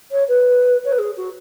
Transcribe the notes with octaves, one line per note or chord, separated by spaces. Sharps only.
C#5
B4
C#5
B4
G#4
F#4